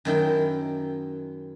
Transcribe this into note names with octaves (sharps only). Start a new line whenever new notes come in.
F#2 D#3 E4 G5